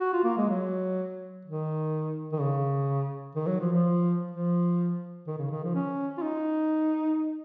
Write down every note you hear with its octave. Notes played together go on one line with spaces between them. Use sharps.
F#4
F4
A#3
G#3
F#3
D#3
D#3
C#3
D#3
F#3
F3
F3
F3
D#3
C#3
D#3
F3
C#4
F4
D#4